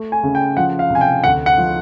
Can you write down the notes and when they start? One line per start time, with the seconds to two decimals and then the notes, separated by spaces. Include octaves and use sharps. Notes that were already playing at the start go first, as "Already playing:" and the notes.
Already playing: A3
0.12 G#5
0.23 C#3
0.35 G5
0.57 F3 F#5
0.79 F5
0.90 C3
0.95 G#5
1.01 G5
1.24 D2 F#5
1.46 F#5
1.58 F3